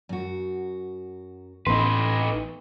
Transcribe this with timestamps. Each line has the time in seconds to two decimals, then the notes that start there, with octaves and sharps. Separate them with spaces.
0.09 F#2 F#4
1.67 A1 B3 D#4 B4 C6